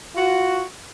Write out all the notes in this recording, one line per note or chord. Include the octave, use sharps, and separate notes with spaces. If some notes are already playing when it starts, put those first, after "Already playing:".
F4 F#4